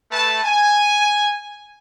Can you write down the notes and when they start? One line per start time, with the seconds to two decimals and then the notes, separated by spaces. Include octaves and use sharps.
0.11 A3 B4 A5
0.44 G#5